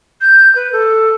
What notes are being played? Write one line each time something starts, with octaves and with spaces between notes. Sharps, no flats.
G6
B4
A4